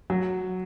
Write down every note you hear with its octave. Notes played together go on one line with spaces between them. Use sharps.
F#3